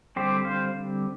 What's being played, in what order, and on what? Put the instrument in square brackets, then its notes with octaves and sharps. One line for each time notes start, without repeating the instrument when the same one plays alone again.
[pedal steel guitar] D3 G3 C4 G4 C5
C5 F5